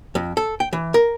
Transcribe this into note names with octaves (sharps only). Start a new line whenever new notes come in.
F2
A4
G5
E3
A#4